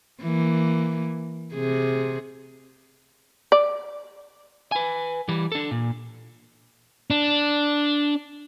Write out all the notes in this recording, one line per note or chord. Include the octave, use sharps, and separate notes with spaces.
E3 A#3
C3 G#4
D5
B4 G#5
E3 G3
D4 A4
A#2
D4